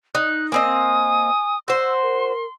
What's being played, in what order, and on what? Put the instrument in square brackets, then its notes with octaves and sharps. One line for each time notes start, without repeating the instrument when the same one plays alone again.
[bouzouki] D#4 [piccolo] F#6
[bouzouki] A#3 C4 D#5 [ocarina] G#5 [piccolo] D#6
[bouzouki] F#4 C5 [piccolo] C6 [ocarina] E6
[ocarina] A#4